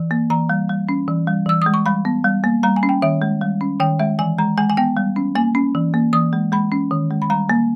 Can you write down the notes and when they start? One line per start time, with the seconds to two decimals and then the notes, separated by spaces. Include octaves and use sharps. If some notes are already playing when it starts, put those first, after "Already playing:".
Already playing: E3
0.11 A#3
0.30 E3 A#5
0.50 G3
0.69 G3
0.89 C#4
1.08 E3
1.28 G3
1.46 E3 E6
1.62 G#3 D#6
1.74 C#6
1.86 G3 B5
2.05 B3
2.24 G3
2.44 A#3
2.63 G3 A#5
2.76 G#5
2.83 C#4
2.89 G5
3.02 D#3 E5
3.22 G#3
3.41 G3
3.61 C#4
3.80 D#3 G5
4.00 G#3 E5
4.19 E3 G#5
4.38 G#3 A#5
4.58 G#3 G#5
4.70 G#5
4.77 B3 G5
4.97 G3
5.16 C#4
5.35 A#3 G#5
5.55 C#4
5.75 E3
5.94 A#3
6.13 E3 D#6
6.33 G#3
6.52 G#3 B5
6.72 C#4
6.91 D#3
7.11 G#3
7.22 B5
7.30 G3 A#5
7.49 A#3